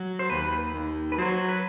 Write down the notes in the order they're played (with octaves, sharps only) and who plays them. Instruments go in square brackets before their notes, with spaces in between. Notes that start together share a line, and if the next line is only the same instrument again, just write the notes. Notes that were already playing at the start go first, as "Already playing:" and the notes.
Already playing: [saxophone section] F#3
[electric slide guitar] C5
[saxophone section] D#2 [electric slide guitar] B4
[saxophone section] D#2
[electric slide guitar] B4
[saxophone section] F#3 [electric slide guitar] C5
[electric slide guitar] B4